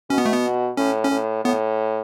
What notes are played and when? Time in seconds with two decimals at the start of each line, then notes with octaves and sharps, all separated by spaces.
0.10 B2 C#4
0.18 B3
0.25 A3
0.33 B3
0.77 A2 C#4
1.04 C#4
1.11 A2
1.45 A2 B3